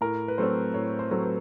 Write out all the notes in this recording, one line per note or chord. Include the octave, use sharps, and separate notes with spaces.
A2 A#4
B4
F#3 A3 C4 C5
A2 C#5
C5
F#3 A3 C4
B4